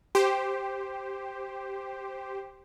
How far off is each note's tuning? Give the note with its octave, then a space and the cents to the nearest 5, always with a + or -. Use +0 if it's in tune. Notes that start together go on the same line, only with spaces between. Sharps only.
G4 +0 C5 +0